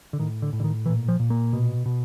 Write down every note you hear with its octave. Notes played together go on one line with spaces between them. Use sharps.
D3
A2 D#3
D3
A2
D3
D#3
A#2 E3
F3
A#2
A#3
B2
B2